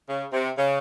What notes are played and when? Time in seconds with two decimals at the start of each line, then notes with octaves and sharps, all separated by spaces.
0.09 C#3
0.33 C3
0.58 C#3